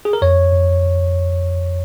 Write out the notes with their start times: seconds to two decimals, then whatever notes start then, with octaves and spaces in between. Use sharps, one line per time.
0.05 G#4
0.13 A#4
0.22 F2 C#5
0.52 F2